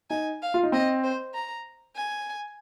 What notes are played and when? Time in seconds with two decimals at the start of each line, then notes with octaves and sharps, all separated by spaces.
0.10 D#4 G#5
0.42 F5
0.54 F4
0.63 D#4
0.72 C4 D#5
1.04 C5
1.34 A#5
1.96 G#5